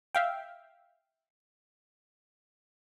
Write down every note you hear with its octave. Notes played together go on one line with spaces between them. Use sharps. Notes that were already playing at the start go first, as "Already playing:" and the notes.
E5 F5 G5